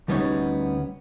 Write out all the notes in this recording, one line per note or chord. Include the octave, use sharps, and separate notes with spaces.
D2 G3 B3 C#4 D#4 C#5